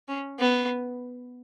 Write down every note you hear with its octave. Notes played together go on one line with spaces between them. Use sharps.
C#4
B3